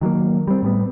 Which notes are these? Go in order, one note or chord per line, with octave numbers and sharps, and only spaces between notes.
D#3 F#3 G3 A#3
G3 C4
A2 G3 B3